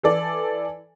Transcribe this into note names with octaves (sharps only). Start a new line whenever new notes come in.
E3 A4 D5